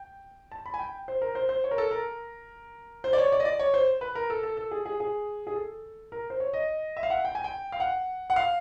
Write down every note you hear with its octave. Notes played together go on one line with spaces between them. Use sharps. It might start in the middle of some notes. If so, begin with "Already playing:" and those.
Already playing: G5
A5
B5
G#5
G5
C5
A#4
C5
C5
C#5
A#4
A4
A#4
C5
D5
C#5
D5
D#5
D5
C#5
C5
B4
A#4
A4
A4
A4
G#4
G#4
G#4
G#4
A4
A#4
C5
C#5
D#5
E5
F5
F#5
G5
G#5
G5
F5
F#5
F#5
F5